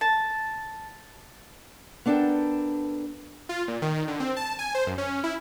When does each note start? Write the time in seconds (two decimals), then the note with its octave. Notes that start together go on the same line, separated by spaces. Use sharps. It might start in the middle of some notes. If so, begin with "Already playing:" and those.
0.01 A5
2.06 B3 D4 A4 A#4 G5
3.49 F4
3.68 A#2
3.82 D#3
3.94 D#3
4.08 D3
4.20 C4
4.36 A5
4.59 G#5
4.75 C5
4.86 F#2
4.98 C#4
5.24 E4